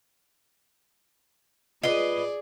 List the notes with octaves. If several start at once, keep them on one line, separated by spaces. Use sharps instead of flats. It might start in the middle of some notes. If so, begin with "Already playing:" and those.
F4 G#4 B4 D5 D#5 C7 G7